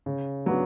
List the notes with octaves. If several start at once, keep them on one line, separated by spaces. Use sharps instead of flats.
C#3
F#3 B3 D4